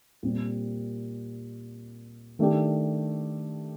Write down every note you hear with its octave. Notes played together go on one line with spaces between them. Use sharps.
A#2 G3 C4 G4
D#3 A3 D4 G4